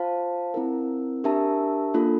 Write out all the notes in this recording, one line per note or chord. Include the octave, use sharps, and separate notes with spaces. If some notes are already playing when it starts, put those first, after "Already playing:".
Already playing: F4 C5 F5 A5
C4 E4 A#4
D4 G4 A#4 E5 A5
A#3 D4 F4 A4